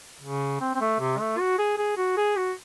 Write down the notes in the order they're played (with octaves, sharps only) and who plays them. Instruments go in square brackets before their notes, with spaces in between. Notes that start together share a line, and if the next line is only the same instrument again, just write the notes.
[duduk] C#3
C4
C4
A3
C3
A3
F#4
G#4
G#4
F#4
G#4
F#4